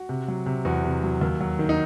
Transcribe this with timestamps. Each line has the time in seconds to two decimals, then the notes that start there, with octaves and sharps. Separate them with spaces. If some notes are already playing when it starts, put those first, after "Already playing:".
Already playing: F#4
0.09 C3
0.28 F#3
0.46 C3
0.65 E2 F#4
0.84 C3
1.03 F#3
1.21 D#2
1.41 F#3
1.59 D#3
1.69 D#4